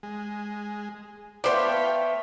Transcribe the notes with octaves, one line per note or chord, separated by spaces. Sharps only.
G#3
A3 B3 A4 C5 D5 F5 G5 B5